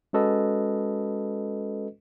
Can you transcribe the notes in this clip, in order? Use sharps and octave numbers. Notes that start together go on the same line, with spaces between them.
G#3 C#4 F#4 A4 B4 D#5